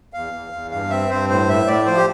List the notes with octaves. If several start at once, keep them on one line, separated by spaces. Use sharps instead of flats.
E2 F5
E2
E2
G2 F5
C4 E5
G2 C5
A2 C5
A2 E5
A2 D5
F3 C5
G4